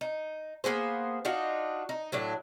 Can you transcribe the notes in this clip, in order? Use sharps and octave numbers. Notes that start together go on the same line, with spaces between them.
D#4
A#3 B3 G#4 C5
D4 D#4 F4 F#4
D#4
A2 F#3 D4